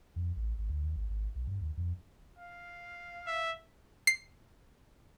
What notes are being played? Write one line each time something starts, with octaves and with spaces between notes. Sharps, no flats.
F2
A1
G#1
D2
D#2
G#1
G#1
B1
G2
D#2
F2
F5
E5
C7